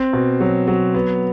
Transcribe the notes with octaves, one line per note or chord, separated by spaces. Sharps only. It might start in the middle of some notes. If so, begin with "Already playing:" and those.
Already playing: C4
B2
F#3
F#3
B3